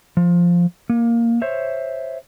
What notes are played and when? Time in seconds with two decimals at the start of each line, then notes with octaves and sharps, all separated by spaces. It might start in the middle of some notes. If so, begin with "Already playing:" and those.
0.17 F3
0.90 A#3
1.42 C5 C#5 E5